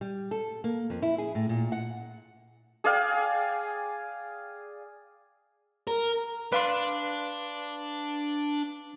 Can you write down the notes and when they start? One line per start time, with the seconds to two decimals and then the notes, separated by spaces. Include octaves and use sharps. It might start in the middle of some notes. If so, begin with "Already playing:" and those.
0.01 G3
0.31 A4
0.64 A#3
0.90 F2
1.02 E4
1.18 G#4
1.35 A2
1.49 A#2
1.72 F#5
2.84 G#4 D5 F5 G5
5.87 A#4
6.53 D4 B4 F5 C6